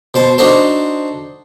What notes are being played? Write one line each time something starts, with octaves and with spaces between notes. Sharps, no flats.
B2 C5 A5
D4 D#4 F#4 A4 C5